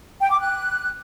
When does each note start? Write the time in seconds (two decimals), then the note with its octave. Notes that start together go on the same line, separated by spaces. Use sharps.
0.21 G5
0.30 D6
0.39 F#6